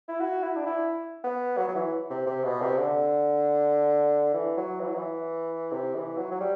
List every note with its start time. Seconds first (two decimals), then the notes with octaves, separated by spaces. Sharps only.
0.08 E4
0.20 F#4
0.43 E4
0.56 D4
0.66 E4
1.24 B3
1.58 F#3
1.68 F#3
1.75 E3
2.10 C3
2.27 C3
2.44 B2
2.61 C3
2.78 D3
4.34 E3
4.57 F#3
4.80 E3
4.88 F#3
4.96 E3
5.72 C3
5.95 E3
6.18 F#3
6.32 F#3
6.41 G3